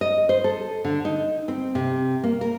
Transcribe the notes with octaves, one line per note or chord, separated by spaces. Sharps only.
D#5
C5
A4
D3
D#4
C4
C3
A#3
A#4